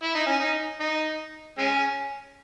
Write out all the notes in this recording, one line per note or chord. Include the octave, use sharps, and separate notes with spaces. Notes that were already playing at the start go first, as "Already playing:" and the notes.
E4
D#4
C#4
D#4
D#4
G#3 C#4